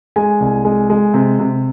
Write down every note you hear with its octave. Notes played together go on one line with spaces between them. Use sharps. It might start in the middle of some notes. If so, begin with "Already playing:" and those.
G#3 G#5
C2
G#3
G#3
C3
C3